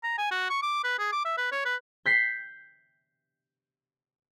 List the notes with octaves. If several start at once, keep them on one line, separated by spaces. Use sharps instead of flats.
A#5
G#5
F#4
C#6
D6
B4
G#4
D6
E5
B4
C#5
B4
G6 B6 C7